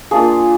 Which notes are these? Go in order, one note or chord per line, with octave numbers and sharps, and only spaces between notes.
A#3 D4 F4 G#4